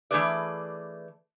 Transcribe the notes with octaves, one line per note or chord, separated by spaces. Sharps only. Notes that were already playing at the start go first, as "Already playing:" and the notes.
E3 A3 D4 G#4 B4 D5